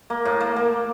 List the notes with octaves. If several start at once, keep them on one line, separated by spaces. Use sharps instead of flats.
A#3
A2
A#3
A#3